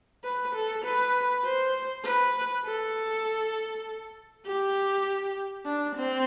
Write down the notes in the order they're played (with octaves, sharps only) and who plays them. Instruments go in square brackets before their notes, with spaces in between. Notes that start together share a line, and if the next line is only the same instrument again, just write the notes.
[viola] B4
A4
B4
C5
B4
A4
G4
D4
C4